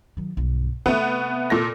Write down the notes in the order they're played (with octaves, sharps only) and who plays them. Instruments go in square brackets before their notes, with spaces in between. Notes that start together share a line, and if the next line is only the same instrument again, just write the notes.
[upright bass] D#3 F#3
B1 G2
[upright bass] C3 [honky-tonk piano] A3 B3
[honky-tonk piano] A#2 A4 A#6